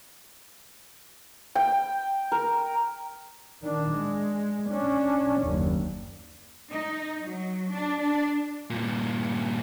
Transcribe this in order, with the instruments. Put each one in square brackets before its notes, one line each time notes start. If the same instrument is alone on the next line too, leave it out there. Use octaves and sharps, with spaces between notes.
[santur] G5
A#4
[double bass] D#3 D4
G#3
C#4 D4
F#1 D#2
[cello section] D#4
F#3
D4
D4
[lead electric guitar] G2 A#2